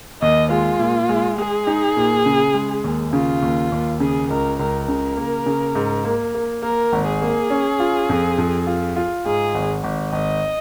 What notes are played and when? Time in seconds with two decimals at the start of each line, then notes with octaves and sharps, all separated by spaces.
0.22 D#2 D#5
0.50 G#3 F4
0.79 A#2
1.09 G#3
1.38 G#3 G#4
1.67 D#4
1.97 A#2
2.26 C#3
2.54 G#3
2.84 D#2
3.13 C#3 F4
3.42 D#2
3.72 D#2
4.00 C#3 G#4
4.30 C#2 A#4
4.59 C#2 A#4
4.87 C#3 A#4
5.17 A#3
5.46 C#3
5.75 G#2
6.04 A#3
6.34 A#3
6.62 A#3 A#4
6.93 G#1
7.07 G#4
7.22 A#3
7.50 C#4
7.80 F4
8.09 F2
8.38 F2
8.67 F4
8.96 F4
9.26 G#2 G#4
9.54 G#1
9.84 G#1
10.12 G#1 D#5